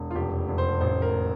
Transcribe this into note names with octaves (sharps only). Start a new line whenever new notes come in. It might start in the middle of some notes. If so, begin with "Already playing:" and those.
Already playing: E1
F4
F1 G4
F1
C5
A1 C5
A#4